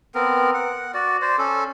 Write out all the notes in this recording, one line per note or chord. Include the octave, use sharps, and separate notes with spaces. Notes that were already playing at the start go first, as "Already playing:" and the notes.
B3 C4 A#4
F#5
F#4 D5
C5 D5
C#4 A4